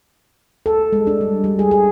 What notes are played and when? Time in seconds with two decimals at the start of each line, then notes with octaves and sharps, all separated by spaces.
0.66 A4
0.93 G#3
1.07 D4
1.21 G3
1.44 G3
1.59 G#4
1.71 G#4